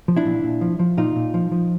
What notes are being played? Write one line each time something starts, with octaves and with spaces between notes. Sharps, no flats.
F3
D4 E4
A#2
A#2
F3
F3
A#2 D#4 F4
A#2
F3
F3